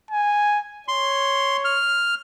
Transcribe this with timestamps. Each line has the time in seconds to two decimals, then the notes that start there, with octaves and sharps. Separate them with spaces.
0.11 G#5
0.88 C#5 C6
1.65 F6